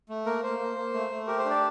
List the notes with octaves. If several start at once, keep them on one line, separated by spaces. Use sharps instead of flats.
A3
A#3 A#4
A#3 C5
A#3
A#3
A3
A3
G4 A#4
C5
D4
D5